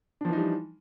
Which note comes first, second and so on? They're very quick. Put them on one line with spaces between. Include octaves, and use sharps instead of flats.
D4 F3 E3 D#4 G3